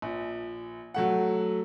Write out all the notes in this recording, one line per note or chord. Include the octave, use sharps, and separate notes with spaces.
A#1
F#3 A3 F#5